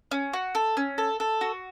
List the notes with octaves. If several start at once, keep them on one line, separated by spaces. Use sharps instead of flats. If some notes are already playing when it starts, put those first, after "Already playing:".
C#4
F#4
A4
C#4
A4
A4
F#4